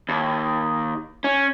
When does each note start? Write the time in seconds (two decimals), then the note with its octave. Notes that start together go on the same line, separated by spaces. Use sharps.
0.09 D#2
1.24 C#4